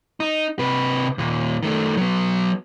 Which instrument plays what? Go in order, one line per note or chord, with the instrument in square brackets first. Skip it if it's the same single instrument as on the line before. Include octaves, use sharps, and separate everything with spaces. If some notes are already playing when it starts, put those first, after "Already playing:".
[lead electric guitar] D#4
C3 B4
D#2 A#2
D#3 A3
F#3 B3